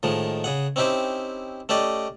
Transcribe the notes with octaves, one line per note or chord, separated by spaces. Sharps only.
A2 D#3 F3 G#3
C#3 G#4 F#5
C4 C#4 D#4 E4 G4 C5
A3 C#4 G4 D5 D#5